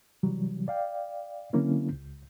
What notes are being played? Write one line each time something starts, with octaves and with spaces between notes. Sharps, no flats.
C3 E3 F#3 G3
D5 F5 G5
D3 F#3 A#3 C4 C#4 E4
C#2